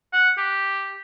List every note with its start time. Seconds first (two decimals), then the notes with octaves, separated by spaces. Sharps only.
0.13 F#5
0.38 G4